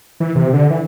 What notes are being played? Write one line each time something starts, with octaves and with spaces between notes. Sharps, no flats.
E3
C3
D3
E3